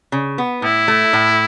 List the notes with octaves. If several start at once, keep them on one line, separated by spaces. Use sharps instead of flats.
C#3
B3
A2 E4
A3
A2